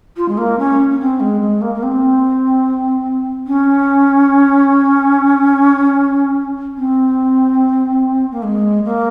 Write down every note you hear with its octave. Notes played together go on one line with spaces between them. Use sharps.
F4
G#3
A#3
C#4
C#4
C4
G#3
G#3
A#3
A#3
C4
C#4
C4
A#3
G#3
A#3